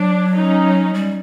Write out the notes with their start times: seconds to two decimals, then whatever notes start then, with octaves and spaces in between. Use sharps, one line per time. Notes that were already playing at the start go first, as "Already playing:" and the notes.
Already playing: F#3 D4
0.36 C#4 D#4
0.94 G3